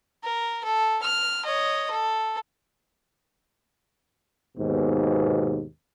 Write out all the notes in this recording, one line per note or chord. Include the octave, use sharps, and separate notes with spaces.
A#4
A4
F6
C#5 D#5
A4
D#2 G#2 B2